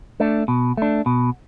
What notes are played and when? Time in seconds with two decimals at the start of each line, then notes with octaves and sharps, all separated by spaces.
0.20 A3 D4
0.48 B2
0.77 A3 D4
1.06 B2